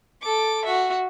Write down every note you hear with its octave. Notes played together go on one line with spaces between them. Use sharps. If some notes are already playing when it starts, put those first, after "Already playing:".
A4 D6
F#4 E5